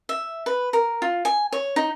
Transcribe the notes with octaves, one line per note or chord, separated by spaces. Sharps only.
E5
B4
A#4
F4
G#5
C#5
D#4